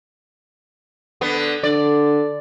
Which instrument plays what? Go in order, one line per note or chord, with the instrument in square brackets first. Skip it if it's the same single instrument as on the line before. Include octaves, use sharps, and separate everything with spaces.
[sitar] D3 B3
[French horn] D3 [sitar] D5